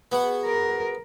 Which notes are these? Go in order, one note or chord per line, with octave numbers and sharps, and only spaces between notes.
B3 F#4 G#4 F#5
A#4